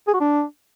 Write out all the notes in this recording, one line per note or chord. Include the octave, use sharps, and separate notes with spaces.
G#4
F#4
D4